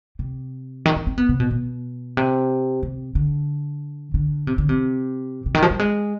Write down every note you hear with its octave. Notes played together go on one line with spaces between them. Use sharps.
C3
D#3
C4
C4
B3
C3
B2
B2
C3
C3
D3
D3
C3
D3
C3
C3
D#3
F3
G3
G#3